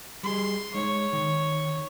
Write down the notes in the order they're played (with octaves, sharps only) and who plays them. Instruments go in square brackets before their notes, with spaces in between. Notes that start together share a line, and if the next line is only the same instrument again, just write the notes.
[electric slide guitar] G3 G#4 [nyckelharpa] C6
[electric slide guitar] G#3 D#4 [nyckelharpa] C#5
[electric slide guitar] D#3